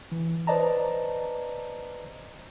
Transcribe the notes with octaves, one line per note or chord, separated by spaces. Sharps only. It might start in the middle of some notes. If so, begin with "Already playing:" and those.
E3
B4 C5 D5 D#5 A5 A#5